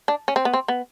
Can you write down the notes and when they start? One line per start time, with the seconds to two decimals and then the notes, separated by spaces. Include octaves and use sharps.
0.08 D4
0.28 C#4
0.36 C4
0.45 B3
0.53 C4
0.68 B3